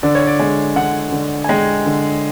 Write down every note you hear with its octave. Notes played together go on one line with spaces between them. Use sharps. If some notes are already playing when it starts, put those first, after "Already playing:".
D3 D5
C#5
D5
G#3
D3 F#5
D3
G#5
G#3 G5
D3